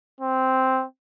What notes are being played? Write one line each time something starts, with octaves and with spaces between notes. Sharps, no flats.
C4